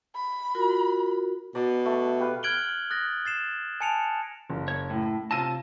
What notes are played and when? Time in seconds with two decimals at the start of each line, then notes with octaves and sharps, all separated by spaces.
0.15 B5
0.55 F4 F#4 A#4
1.55 B2 D5 A#5
1.85 A3
2.19 G4 B4 F5
2.43 F6 F#6 G#6 D7 F#7 G7
2.90 D#6 F#6 A6 A#6
3.25 A6 C7 E7
3.81 G#5 A5 C#7 D7 F7
4.50 F#1
4.68 C#5
4.90 A2
5.31 C3 F4 A5 E6 A#6 D#7